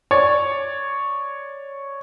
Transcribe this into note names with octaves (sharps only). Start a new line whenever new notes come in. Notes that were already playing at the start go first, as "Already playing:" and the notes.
C#5 D5